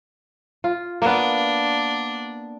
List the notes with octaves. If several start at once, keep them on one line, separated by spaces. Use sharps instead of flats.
F4
A#3 B3 D4